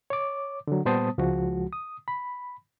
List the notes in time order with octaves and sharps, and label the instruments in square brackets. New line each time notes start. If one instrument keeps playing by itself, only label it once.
[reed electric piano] C#5 D6
D3 F#3
A#2 G3 B3 C5 A5 D#6
C#2 F3 G#3 F#4
D#6
B5